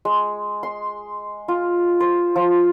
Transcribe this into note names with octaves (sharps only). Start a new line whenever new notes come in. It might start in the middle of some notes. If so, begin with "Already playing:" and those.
G#3
C6
F4
C5
F3